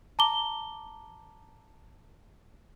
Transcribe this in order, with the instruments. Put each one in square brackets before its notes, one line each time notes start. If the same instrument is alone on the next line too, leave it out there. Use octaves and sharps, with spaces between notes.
[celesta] A5 A#5 D6 G7